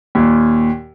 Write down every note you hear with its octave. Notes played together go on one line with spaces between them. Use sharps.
D#2 A#2